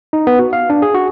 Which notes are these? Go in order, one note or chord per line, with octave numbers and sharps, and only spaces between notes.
D#4
B3
F#4
F5
D4
G#4
F#4